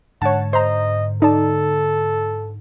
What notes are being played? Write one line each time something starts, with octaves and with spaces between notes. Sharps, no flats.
G#2 D3 C#5 F#5 A5
C5 D#5 A#5
D#4 A4 D5 A5